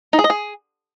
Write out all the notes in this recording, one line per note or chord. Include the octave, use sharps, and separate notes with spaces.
D#4
G#4
D#5
G#4